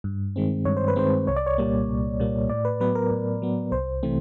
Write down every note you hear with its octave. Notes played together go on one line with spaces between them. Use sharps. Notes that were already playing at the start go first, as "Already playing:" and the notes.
G2
D#3 G#3 C4
G2 C#5
C5
B4
D#3 G#3 C4 C5
C2 C#5
D5
C#5
A#2 G3 A#3
C2
A#2 G3 A#3
A2 D5
B4
F#3 B3 B4
A#4
A2
F#3 B3
C2 C5
C3 E3 A3 C4